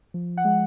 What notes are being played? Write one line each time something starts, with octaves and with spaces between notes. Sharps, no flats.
F3
F#5
G#3